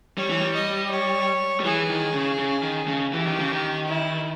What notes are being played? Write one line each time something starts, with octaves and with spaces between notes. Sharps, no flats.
G3 C#5
E3
G3
D#5
C#5
G3
E3 G#4
D#3
C#3
C#3
D#3
C#3
E3 G4
D#3
C#3
D#3
E4